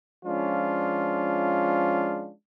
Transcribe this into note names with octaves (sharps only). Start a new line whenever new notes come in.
F3 G#3 C#4 D4 F4